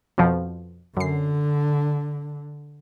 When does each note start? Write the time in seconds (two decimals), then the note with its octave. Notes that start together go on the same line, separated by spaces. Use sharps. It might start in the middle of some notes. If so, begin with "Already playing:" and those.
0.18 F2 B2 F3
0.97 F#2 D3 C7